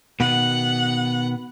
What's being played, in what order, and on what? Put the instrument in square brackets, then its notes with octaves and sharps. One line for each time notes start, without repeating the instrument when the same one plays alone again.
[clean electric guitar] B2 D#3 B3 [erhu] F#5